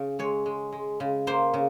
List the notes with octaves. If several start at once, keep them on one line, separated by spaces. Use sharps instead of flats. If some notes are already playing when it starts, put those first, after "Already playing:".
Already playing: C#3
G#3 C#5
G#3
G#3
C#3
A#3 C5
C#3